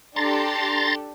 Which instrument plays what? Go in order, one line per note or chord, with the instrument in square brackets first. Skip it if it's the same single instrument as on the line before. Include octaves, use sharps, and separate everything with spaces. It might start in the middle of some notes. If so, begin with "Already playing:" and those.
[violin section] D4 G4 A4 [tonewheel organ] A#5 C6 A6